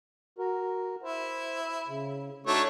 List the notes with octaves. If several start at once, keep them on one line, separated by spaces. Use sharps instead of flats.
F#4 A#4
E4 C5
C#3
A3 D4 D#4 F#4 C#5